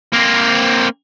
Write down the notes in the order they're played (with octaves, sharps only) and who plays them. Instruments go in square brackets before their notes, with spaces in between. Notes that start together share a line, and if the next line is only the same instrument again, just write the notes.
[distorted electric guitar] A#3 C4